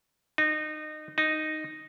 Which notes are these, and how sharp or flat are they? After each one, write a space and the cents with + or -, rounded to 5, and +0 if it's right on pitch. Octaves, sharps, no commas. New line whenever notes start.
D#4 -25
D#4 -5